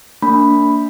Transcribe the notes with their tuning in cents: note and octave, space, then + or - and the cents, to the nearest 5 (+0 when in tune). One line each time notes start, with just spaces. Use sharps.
A#3 -40 D4 -20 B5 +0